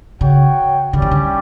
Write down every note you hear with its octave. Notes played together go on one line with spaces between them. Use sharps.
C#3 F#4 C#5 G5
D3 G3 C#4 G4 D5
E3
D3